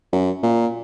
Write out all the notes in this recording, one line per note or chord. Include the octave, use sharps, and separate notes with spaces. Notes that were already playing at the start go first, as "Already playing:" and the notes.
F#2
A#2